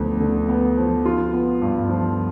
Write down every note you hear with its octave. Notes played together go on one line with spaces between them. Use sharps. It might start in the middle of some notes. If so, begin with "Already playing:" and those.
Already playing: D2 F3 B3
D3
B3
F3
F4
B3
G2
F3